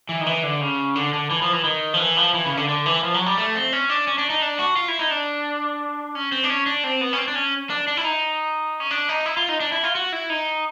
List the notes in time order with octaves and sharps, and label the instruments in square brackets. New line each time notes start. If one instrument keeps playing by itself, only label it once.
[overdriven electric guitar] E3
D#3
E3
D3
C#3
D3
D3
E3
F3
E3
D#3
F3
E3
F3
E3
C#3
D3
D3
E3
F3
F#3
G3
A3
C4
C#4
D4
C#4
D4
D#4
D4
F#4
F4
E4
D#4
D4
C#4
C4
D4
C#4
D4
C4
B3
C#4
C4
D4
C#4
D4
D4
E4
D#4
C#4
D4
D#4
E4
F4
D#4
D4
E4
F4
F#4
E4
D#4